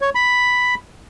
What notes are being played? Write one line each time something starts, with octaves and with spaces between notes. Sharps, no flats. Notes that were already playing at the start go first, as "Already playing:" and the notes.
C#5
B5